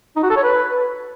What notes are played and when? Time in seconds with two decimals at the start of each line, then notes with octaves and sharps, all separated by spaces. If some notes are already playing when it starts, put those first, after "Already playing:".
0.16 D#4
0.23 F#4
0.30 A4
0.37 C#5
0.43 B4